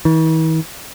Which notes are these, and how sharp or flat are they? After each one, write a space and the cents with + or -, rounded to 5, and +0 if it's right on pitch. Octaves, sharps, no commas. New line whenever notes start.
E3 -45